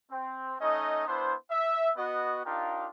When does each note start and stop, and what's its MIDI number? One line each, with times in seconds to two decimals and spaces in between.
0.11 0.56 60
0.61 1.06 57
0.61 1.06 61
0.61 1.06 63
0.61 1.06 75
1.07 1.34 59
1.07 1.34 62
1.07 1.34 64
1.07 1.34 72
1.51 1.91 76
1.97 2.41 59
1.97 2.41 66
1.97 2.41 75
2.46 2.88 62
2.46 2.88 63
2.46 2.88 65
2.46 2.88 67
2.46 2.88 70
2.46 2.88 77